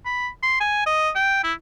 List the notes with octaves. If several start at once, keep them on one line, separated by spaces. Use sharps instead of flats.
B5
C6
G#5
D#5
G5
E4